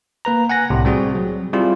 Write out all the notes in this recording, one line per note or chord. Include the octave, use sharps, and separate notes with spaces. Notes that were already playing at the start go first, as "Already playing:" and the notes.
A#3 B4 A#5
F#5 G#5 F#6 A#6
C2 A2 C3
G3 C4 F#4 G#4
F#3
G3 C4 E4 F4 G#4